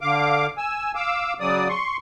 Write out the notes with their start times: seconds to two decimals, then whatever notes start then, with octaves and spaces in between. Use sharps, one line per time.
0.01 D3 F5 D6
0.58 G#5 E6
0.95 F5 D6 E6
1.40 C#3 F#3 D5 D#6
1.69 C6 C#6